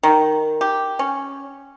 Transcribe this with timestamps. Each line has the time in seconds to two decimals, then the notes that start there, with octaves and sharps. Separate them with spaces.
0.03 D#3
0.61 G4
0.99 C#4